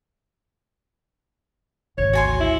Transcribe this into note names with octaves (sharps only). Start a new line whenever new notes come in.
G#1 D2 C#5
F#4 G#5 C6
E4